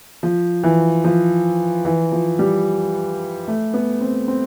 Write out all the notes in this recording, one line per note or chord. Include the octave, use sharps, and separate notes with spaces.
F3
E3
F3
E3
F3
G3
A3
B3
C4
C4